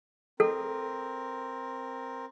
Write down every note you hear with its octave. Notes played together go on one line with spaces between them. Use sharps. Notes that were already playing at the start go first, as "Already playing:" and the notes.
C4 A4 A#4